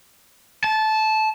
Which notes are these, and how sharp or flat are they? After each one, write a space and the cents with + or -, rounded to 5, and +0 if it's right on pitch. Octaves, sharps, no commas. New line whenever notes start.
A5 -15